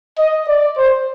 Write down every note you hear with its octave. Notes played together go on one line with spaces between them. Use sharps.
D#5
D5
C5